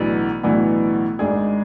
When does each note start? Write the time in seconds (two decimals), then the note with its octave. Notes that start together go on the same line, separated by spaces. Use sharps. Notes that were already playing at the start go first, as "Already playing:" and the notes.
Already playing: B1 A2 E3 B3 D4
0.43 B1 A2 E3 B3 D4
1.19 G#1 G#2 G#3 D4 G#4